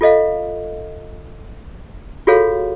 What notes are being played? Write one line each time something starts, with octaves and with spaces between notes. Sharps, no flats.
F4 A4 D#5 F5
F4 F#4 G#4 A4 C#5 F5